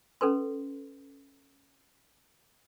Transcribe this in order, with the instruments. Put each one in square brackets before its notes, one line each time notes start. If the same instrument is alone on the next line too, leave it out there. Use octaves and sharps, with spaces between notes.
[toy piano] C#4 A4 B4 C6